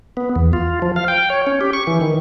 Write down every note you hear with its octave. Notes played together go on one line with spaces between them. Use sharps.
B3
E2
F4
F3
F5
G5
C#5
C#4
G4
C#6
E3
D#3